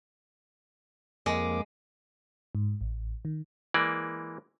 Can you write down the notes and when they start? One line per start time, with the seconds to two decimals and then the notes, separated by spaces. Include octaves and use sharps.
1.26 F2 G#3 A#3 D6
2.55 G#2
2.81 A1
3.25 D#3
3.74 E3 G#3 A#3 D5